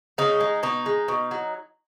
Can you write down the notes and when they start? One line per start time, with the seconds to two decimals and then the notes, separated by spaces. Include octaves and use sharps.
0.18 C#3 D#4
0.40 G#3
0.63 B2 D#4
0.86 G#3
1.08 B2
1.31 F#3